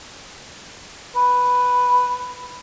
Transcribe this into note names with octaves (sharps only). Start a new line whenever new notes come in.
B4